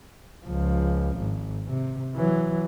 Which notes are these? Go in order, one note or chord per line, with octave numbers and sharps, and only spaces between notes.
C#2 F3
G#1
C3
E3 F#3